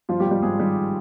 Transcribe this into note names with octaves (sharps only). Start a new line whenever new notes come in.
G2 F3 F4
G3 G4
G#1
G3 G4
G#1 G#3 G#4
D#3 G3 G4